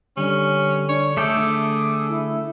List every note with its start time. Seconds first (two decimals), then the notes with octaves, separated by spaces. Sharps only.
0.17 D3 G3 C#4
0.89 D4 C#5
1.17 A3 G#4 A4 D6 G6
1.37 D3
2.10 E4